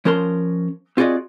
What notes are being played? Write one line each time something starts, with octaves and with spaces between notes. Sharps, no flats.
F3 C#4 A#4 A5 C6
C4 F4 F#4 G#4 D5 D#5